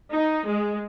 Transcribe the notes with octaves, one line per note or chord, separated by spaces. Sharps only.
D#4
G#3